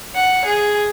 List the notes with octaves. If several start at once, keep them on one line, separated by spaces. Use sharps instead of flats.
F#5
G#4